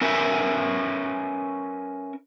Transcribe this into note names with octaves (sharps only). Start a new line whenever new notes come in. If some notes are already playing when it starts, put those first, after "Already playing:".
C#4 A#4 B4 E5